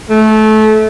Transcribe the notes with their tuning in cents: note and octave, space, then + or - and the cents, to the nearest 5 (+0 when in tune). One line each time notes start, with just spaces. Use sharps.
A3 -25